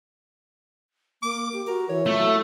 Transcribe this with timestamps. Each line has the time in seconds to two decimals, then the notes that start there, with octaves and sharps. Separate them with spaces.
1.22 A#3 D6
1.53 G4
1.67 F#4 A#4
1.89 E3 C#5
2.06 A3 F4
2.18 F#3 E4